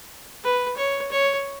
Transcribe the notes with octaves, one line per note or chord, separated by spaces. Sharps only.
B4
C#5
C#5